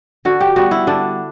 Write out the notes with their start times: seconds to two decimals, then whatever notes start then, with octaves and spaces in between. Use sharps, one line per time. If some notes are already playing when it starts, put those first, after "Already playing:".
0.25 D3 F#4
0.41 G4
0.56 G3 B3 F#4
0.71 E4
0.87 D3 D4